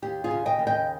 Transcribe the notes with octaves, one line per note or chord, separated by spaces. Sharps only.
D#2 G4
F4 G#4
C#3
D#5 G5
D#2
D#5 G5